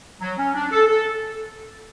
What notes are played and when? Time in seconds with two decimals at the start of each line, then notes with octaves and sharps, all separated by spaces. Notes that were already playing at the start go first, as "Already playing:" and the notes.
0.21 F#3
0.38 C#4
0.54 D4
0.71 A4
0.87 A4